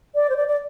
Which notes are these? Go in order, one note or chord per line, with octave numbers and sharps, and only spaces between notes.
D5
C5
D5
D5